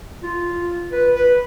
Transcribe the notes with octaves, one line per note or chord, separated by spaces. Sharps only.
F4
B4
B4